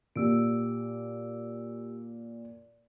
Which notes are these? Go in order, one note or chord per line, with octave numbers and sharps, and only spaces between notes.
A#2 G4 E6 D7